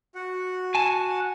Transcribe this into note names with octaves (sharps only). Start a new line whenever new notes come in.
F#4 F#5
G#5 A5